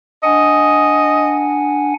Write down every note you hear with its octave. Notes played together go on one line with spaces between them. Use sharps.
D4 D#5 F#5 G#5